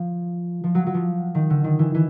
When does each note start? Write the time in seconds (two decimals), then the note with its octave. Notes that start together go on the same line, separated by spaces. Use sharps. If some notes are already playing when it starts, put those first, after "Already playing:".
Already playing: F3
0.64 F3
0.75 F#3
0.87 F#3
0.94 F3
1.35 D#3
1.50 D3
1.64 D#3
1.79 E3
1.95 E3